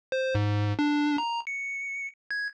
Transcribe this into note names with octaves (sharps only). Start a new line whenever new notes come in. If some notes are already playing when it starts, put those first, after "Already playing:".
C5
G#2
D4
A#5
C#7
G#6